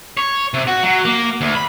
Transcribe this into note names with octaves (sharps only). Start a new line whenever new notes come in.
C#5
C3
F#4
F#3
A#3
D2
B5